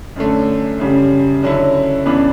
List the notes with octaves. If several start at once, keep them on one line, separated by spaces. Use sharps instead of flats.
F#2 D3 A3 C#4
F#2 C#3 G3
D3 F#3 C#4 E4
F#2 E3 B3 D4